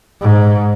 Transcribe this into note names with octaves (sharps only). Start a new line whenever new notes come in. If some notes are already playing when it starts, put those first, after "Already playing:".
G#2